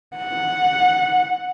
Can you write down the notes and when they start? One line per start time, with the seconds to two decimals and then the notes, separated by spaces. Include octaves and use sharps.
0.16 F#5